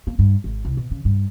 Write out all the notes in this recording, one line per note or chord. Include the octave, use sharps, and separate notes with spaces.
A#3
G2
G#1
C2
B2
C#3
G2